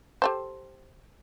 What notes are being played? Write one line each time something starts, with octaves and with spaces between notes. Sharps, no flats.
G4 A4 C5